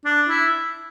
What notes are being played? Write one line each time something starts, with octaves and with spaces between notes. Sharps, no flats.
D4
E4